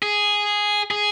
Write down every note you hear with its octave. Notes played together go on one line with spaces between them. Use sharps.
G#4
G#4